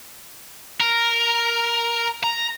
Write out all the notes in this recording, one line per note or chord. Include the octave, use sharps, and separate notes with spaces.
A#4
A#5